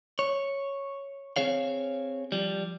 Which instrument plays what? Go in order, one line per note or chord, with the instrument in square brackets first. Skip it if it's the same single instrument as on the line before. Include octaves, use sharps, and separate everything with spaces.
[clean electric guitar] C#5
C4 G#4 C#5 F5
F3 G3